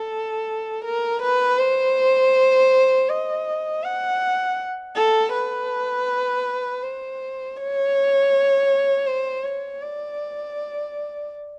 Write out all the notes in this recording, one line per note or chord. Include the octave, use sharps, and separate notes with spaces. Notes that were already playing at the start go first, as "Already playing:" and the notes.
Already playing: A4
A#4
B4
C5
D#5
F#5
A4
B4
C5
C#5
C5
C#5
D5